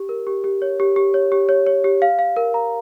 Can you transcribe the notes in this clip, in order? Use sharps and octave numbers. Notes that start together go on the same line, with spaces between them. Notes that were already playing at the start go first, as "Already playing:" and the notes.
Already playing: G4
A#4
G4
G4
C#5
G4
G4
C#5
G4
C#5
C#5
G4
F5
F5
A#4
A#5